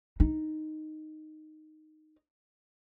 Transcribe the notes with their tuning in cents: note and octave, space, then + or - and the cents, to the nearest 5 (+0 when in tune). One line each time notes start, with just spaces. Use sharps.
D#4 -5